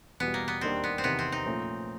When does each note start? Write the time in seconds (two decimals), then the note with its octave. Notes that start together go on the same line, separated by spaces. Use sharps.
0.20 E2 B2 G3 B3
0.34 A#3
0.48 B3
0.61 D#2 D#3 G3 A#3 C4 D4
0.84 B3
0.98 C4
1.04 E2 C3 D#3 B3
1.19 C4
1.32 D#4
1.46 A#2 F3 A3 C#4